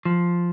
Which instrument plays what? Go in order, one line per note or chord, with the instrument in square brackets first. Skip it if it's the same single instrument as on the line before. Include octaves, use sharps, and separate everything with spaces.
[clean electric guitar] F3